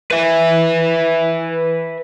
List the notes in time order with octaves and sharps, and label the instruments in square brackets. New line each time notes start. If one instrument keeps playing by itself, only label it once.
[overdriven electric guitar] B4 E5